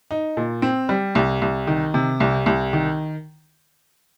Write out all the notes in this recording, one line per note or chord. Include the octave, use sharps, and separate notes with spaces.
D#4
A#2
C4
G3
C2
C2
D#3
C3
C2
C2
D#3